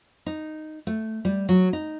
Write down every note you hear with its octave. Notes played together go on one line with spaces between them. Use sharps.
D#4
A3
G3
F#3
D#4